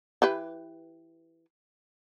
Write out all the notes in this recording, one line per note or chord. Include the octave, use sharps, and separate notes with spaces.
E3 G4 B4